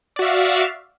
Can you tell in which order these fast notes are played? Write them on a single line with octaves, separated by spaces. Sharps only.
D5 F#4 E5 F5